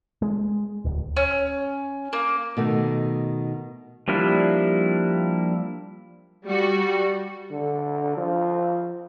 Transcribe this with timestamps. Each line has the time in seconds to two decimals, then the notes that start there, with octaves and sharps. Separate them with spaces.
0.22 G#3
0.85 D1
1.16 C#4
2.13 A#3
2.57 B2 D#3 A3
4.08 F3 G3 A#3 D4 E4
6.47 G3 F#4
7.51 D3
8.17 F3